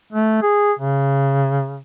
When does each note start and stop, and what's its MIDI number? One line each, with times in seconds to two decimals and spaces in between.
0.13 0.40 57
0.42 0.73 68
0.79 1.82 49